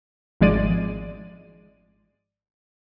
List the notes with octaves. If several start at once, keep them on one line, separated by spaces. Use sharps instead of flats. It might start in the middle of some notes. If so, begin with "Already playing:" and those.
G#1 F3 G#3 D5 D#7